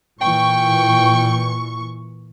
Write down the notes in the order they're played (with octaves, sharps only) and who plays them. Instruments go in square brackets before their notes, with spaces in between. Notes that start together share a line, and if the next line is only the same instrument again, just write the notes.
[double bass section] A#2 E3 [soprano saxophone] G5 [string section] C#6